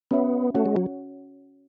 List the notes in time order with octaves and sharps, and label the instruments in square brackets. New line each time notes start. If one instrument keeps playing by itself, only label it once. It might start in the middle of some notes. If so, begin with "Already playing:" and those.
[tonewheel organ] B3 [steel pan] C#4 F#4 C#5 E5 B5
[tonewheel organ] A3 [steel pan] C#4 F#4 C#5 F#5
[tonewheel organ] G#3
F#3